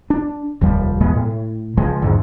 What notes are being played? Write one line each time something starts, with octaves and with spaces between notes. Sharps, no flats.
D4
F1 D#2 F3 G3
E2 B2 G#3 B3
A2
C#2 F3 G#3
E2 G#2 D3